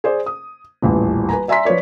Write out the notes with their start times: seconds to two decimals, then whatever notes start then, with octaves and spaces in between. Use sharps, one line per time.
0.04 G#4 C5 D5
0.26 D#6
0.82 D#1 A1 E2
1.29 B4 G#5 A#5
1.48 D5 E5 G#5 A#5 C6 B6
1.65 F3 F4 B4 C#5 D5